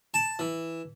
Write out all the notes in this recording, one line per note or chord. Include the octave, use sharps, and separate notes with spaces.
A5
E3